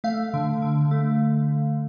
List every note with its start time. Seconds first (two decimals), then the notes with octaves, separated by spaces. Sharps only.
0.04 A3 F5
0.34 D3
0.62 D3
0.91 A3